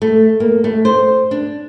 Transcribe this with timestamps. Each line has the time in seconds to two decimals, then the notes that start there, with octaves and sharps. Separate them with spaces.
0.02 A3
0.40 A#3
0.64 A3
0.85 C5
1.31 D4